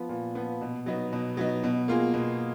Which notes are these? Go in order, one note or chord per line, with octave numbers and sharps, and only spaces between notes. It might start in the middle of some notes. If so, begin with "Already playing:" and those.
Already playing: F3 B3
A#2
F3 B3
B2
F#3 B3 D#4
B2
F#3 B3 D#4
B2
A#3 F4 G#4
B2